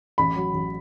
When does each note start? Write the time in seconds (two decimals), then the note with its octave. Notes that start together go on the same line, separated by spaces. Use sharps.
0.18 A1 B5
0.36 F#3
0.54 A1